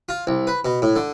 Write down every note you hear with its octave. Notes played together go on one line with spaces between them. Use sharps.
F4
C2
B4
B2
A2
D3